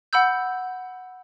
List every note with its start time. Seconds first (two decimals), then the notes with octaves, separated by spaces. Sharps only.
0.13 F#5 B5 E6 G6